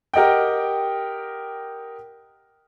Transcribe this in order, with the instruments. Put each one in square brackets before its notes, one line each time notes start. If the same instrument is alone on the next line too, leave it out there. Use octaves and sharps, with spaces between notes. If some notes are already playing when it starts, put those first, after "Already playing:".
[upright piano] G4 A#4 D#5 F#5 G5